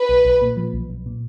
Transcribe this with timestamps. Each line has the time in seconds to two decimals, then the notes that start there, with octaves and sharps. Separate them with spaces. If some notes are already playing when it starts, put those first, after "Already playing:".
Already playing: B4
0.09 B1
0.25 B1
0.42 A#2
0.57 F3
0.74 B1
0.90 B1
1.06 A#2